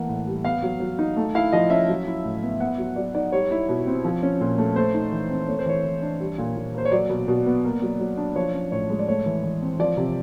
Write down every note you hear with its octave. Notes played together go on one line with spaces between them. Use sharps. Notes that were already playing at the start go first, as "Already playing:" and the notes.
Already playing: E3 A3 A#3 F#5
A2
G3
B3 F5
F#3
F#3
D#4
A3
E4 F5
F3 D#5
C#4 E5
F#3
E4
A2
B3
B3 F#5
F#3
F#3 D5
D#4 D5
G3 C#5
E4
B2
C4
F3
C#4
A#2
A3
A3 C5
D#4
E3
C4
A3 C#5
C5
E3 C#5
E3
D4
G3
A#2
A#2
A#3 C5
C#5
F#3 D5
B2
B2
B3
A#3
F#3
F#3
D4
F3 C#5
C#4
A2 C#5
G#3
D5
A3 C#5
E3
E3
C4
F3 D5
C3